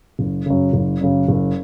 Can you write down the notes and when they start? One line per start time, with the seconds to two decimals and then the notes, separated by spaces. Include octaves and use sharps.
0.19 F#1
0.46 F#2 C#3
0.73 F#1
1.01 F#2 C#3
1.28 F#1